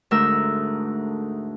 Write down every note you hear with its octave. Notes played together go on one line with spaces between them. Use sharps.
D2 G#2 A3 A#4 E6